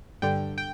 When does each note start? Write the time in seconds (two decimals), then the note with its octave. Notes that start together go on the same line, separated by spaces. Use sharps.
0.22 G2 D3 G5
0.58 G5